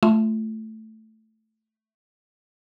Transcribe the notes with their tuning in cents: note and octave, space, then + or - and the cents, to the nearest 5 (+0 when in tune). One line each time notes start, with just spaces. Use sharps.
A3 +0 F4 -25